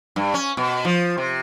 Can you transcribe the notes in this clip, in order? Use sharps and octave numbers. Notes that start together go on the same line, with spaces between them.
G2
C#4
B2
F3
C3